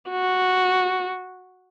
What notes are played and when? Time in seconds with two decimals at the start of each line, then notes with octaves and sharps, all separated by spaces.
0.11 F#4